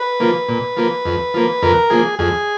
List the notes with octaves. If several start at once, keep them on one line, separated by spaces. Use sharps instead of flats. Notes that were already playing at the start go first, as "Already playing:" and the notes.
Already playing: B4
F3 A#3
A#2
F3 A#3
F2
F3 A#3
F2 A#4
F3 A#3 G#4
F2 G#4